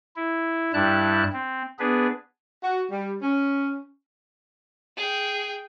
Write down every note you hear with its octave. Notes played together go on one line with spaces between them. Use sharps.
E4
G2 G3 E4 A5 F#6
C4
B3 D4 G#4 B4
F#4
G3
C#4
G#4 G5